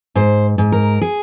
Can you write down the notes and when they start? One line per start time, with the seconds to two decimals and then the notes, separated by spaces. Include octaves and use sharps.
0.15 G#2 C5
0.58 G#2
0.72 A#4
1.01 G#4